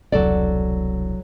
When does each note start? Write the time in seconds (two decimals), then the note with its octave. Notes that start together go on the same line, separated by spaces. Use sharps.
0.12 E1 C2 F#3 A4 D5